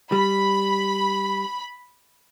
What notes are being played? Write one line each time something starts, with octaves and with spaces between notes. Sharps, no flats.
G3 B5